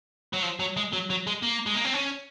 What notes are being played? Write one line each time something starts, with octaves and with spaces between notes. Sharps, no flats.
F#3
F3
F#3
G#3
F#3
F#3
G#3
A#3
G#3
A#3
C4
C#4